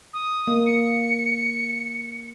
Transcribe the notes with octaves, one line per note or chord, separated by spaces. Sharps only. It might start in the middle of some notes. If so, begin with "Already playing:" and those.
D#6
A#3
C#7